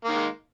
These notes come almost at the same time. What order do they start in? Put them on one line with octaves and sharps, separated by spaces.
A#3 D#3 G#3